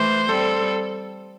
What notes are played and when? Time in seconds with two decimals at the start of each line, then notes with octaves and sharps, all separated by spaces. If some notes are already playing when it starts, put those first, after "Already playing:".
Already playing: E3 A3 C5
0.29 G3 C4 A4